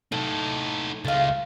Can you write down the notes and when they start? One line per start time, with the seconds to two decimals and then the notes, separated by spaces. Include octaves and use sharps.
0.12 A2 D#4 A4
1.05 C#2 G#3 A3 F4